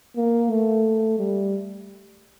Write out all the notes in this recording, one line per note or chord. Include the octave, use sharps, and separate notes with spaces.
A#3
A3
G3